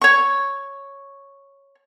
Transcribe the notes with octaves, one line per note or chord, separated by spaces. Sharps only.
C#5 C#6